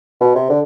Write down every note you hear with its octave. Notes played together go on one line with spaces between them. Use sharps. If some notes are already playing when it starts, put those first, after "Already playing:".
B2
C3
D3